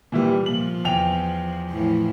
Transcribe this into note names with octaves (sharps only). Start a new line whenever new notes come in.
A#2 E3 G3
A#2 F3 F#7
E2 G5 F7
A2 E3 F3